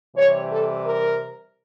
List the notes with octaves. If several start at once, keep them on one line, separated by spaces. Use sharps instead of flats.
C3 E3 G3 C#5
A4
A#4